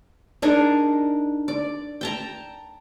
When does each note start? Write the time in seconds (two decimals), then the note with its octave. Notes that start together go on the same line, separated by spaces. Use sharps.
0.42 D4 D#4 G#4 A#4
1.48 D5
2.01 G5 A5 A#5